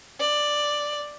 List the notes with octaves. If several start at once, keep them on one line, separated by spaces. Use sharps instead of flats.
D5